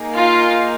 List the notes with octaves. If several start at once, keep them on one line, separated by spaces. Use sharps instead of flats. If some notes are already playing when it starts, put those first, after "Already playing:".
Already playing: A#3 D#4 G#4
F4 F5